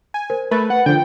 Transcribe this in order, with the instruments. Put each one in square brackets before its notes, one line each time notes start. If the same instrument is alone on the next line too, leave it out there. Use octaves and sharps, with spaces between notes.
[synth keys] G#5
[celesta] A#4 C5
[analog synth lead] A3 [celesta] A#4 B5 A6 [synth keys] B4
[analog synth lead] F#5
[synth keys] D3 F3 [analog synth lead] G5